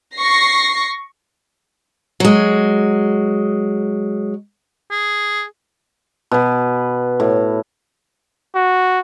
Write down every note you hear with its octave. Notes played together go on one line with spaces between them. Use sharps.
C#6 A#6 C7
F#3 G#3
G#4
B2 B4
A2
F#4